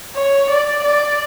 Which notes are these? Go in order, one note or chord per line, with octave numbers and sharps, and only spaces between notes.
C#5
D5
D5